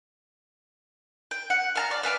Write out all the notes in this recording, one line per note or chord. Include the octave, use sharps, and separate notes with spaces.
G5
F#5
F5 A5 A#5
D5
B4 F5 G#5 D6